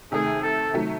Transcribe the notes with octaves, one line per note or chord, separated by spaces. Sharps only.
C3 D#3 A3 G#4
A4
C3 D#3 F#3 A3